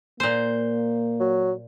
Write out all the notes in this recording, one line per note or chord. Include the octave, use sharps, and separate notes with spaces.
A#2 A#3 C5
F#3